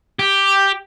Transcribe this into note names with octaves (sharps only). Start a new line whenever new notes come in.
G4